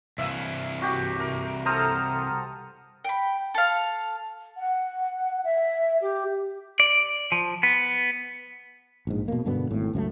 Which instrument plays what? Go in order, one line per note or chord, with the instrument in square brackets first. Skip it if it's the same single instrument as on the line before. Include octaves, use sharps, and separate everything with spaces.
[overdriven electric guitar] C2 E3 [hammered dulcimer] E5 F5
[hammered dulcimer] F#4 G4 F#5
A#4
[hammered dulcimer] A4 C5 [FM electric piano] A#5 D#6 F6
[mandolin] G5 B5
A4 F5
[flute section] F#5
E5
G4
[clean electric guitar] D5
F3
B3
[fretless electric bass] A#1 G#2
B2 A#3
G2 B2 D3 B3
G#1 A2
C#2 F#2 E3 A3